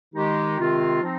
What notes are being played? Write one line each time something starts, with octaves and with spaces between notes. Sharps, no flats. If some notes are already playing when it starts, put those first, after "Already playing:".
D#3 G#3 D#4 G4
C3 D#3 G#3 C4 F4
F3 C4 D#4